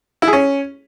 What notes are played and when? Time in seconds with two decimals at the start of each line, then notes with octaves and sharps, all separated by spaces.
0.22 E4
0.28 G#4
0.33 C#4